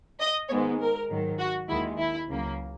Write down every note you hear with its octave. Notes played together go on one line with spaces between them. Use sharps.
D#5
G#2 D#3 G#3 B3 C#5
A#4
G#2 D#3 F#3
F#4
D#2 D#3 G#3 E4
E4
C#2 C#3 F#3 A#3